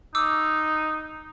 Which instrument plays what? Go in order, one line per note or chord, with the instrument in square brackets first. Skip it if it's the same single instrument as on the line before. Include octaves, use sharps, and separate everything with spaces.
[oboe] D#4 [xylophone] D6 E6